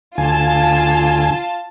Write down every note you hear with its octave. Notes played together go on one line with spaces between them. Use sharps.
D2 F4 G#5 A5